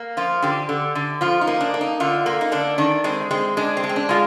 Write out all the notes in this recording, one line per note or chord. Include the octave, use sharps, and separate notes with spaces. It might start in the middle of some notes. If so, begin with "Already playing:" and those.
Already playing: A#3
F3 F4
D3 G4
D3
D3
F3 F4
D#4
A#3
D4
A#3
D#4
D3 F4
A#3
D#4
D3 D4
D#3 D4
G#3 C4
G#3 C4
G#3 D4
C4
G#3
C4
D4
G#3 F4